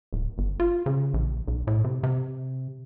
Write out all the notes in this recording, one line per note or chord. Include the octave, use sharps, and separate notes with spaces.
D1
G1
F4
C#3
A#1
B1
A2
C3
C3